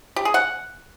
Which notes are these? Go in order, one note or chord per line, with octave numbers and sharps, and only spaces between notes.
G4
G#4
F#5